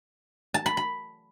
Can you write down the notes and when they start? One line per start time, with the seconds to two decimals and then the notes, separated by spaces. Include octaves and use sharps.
0.54 A5
0.66 B5
0.77 B5